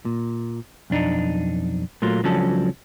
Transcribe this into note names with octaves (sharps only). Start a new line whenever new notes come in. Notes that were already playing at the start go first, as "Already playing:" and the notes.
A#2
B1 F2 D4 D#4
A#2 F#3 A3 A#3 F4
C#2 F3 F#3 C#4 D4 A4